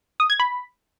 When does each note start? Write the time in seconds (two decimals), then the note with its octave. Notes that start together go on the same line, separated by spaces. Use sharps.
0.20 D#6
0.30 G#6
0.40 B5